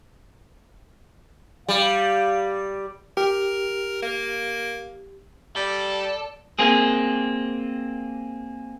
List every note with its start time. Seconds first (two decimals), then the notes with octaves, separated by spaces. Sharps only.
1.69 G3 F5
3.17 G4 A#4
4.02 A#3
5.56 G3 A4 D5
6.59 A#3 C4 G#4